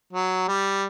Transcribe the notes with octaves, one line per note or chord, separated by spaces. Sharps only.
F#3
G3